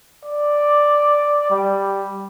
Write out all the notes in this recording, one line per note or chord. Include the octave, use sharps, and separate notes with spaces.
D5
G3